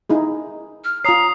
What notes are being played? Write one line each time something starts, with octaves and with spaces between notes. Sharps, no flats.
D#4 E4 G#4
F6
F4 C#5 A#5 D#6 C7